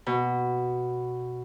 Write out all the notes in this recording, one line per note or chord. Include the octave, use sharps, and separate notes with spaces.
B2